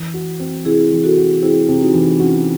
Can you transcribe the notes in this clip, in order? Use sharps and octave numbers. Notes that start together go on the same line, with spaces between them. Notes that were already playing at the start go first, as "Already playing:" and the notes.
Already playing: E3
F#4
C4
C3 E4 G#4
E3
F#4 A4
F#4
C4 E4 G#4
C3
D#4 F#4
E3
C#4 E4 F#4